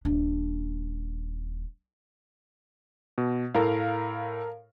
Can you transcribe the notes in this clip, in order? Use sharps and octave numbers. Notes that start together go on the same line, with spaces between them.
D#1 D4
B2
A2 A4 A#4 F5